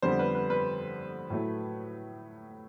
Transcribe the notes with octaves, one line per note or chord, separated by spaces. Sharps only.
F2 D3 G3 B3 C5
B4
B4
B4
A2 F#3 A3